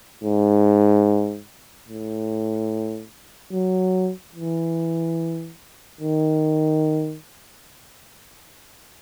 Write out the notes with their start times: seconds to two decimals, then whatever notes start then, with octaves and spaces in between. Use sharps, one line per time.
0.24 G#2
1.88 A2
3.53 F#3
4.35 E3
6.01 D#3